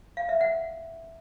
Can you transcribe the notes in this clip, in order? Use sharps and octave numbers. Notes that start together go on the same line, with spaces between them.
F5
E5
F#5